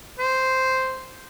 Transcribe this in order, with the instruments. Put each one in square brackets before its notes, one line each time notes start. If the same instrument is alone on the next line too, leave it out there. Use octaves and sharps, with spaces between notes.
[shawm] C5